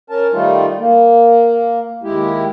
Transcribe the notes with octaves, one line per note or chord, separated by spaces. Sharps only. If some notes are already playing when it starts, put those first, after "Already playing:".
C#4 A#4 A5
D#3 G3 A3 D#4 F4
A#3
D#2 G#3 E4 G4